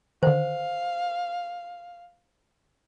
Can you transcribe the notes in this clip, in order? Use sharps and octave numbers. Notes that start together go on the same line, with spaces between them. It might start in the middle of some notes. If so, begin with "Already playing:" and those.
D3 D#3 C5 F5